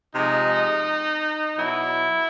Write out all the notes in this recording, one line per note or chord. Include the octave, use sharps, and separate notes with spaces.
C3 F3 G#3 D#4
B2 F#3 E4